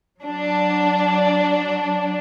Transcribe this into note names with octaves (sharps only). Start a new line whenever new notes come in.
F#3 D4